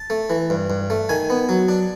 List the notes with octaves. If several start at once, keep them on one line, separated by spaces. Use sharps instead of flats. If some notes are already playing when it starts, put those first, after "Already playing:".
Already playing: A5
A3
E3
G2
G2
A3
D#3 G#5
B3
F#3
D4